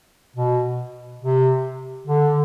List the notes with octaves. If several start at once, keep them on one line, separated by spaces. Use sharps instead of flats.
B2
C3
D3